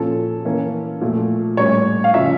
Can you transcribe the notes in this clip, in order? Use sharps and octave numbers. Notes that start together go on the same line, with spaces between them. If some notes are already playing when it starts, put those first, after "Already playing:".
Already playing: A#2 F3 C#4 A4
E3 A#3 C#4
A#2 F3 A3
A2 G3 C#4 C#5
F5
C#3 F3 C#4 E5